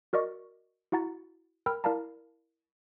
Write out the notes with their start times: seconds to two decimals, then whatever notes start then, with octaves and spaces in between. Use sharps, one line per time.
0.13 F#4 A#4 D5 D#5 C#6
0.92 E4 F#4 F#5 A#5 A6
1.66 A#4 G5 B5 E6 F6
1.84 E4 A#4 D5 F5 A5 A#5